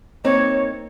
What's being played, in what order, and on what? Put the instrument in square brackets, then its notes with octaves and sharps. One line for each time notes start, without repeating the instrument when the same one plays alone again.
[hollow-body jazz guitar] A#3 C4 D#4 [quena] C#5